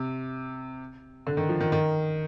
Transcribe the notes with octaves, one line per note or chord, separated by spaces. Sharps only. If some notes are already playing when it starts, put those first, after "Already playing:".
Already playing: C3
D3
D#3
F3
D#3
D#3